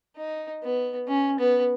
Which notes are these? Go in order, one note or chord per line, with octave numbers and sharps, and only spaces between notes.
D#4
B3
C#4
B3